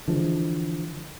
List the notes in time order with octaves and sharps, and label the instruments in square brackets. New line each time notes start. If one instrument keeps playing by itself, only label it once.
[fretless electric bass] D3 E3 F3 G#3